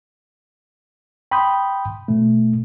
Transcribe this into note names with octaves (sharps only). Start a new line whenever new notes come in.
G5 B5 C6 D#6 G6
B2 A3